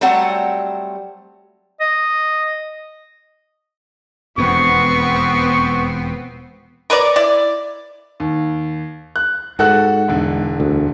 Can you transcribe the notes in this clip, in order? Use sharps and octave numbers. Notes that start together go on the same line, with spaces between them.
F#3 G3 A3 C4 F#5
D#5
E1 F2 B3 C4 C#6
A#4 B4 C#5 D5
E4 D5
D#2
F#6
G#2 F#4 A4 F#6
E1 D3
D2